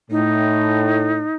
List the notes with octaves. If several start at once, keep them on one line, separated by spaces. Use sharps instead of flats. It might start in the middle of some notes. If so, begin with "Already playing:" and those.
A2 D#4